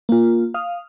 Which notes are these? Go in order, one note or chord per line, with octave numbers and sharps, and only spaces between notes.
A#3 F4
F5 D#6